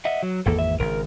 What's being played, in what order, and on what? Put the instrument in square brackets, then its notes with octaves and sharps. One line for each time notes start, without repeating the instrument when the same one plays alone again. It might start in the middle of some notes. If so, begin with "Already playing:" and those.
[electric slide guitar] D#5 E5 F#5
F#3
[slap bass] G#1 E2 A#3 [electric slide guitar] A4
[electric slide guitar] E5
[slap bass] G#1 C#3 [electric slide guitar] A#4